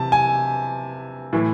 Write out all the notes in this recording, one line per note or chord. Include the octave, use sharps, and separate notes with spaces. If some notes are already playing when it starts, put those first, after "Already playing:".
Already playing: C3 E3 A5
G#5
A2 E3